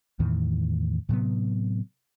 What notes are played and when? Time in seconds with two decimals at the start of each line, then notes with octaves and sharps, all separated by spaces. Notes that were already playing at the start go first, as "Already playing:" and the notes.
0.20 E2 A2 D#3 E3
1.09 A2 C3 F#3 B3